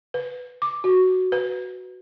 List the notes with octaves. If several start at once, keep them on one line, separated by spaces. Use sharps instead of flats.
B4
D6
F#4
B4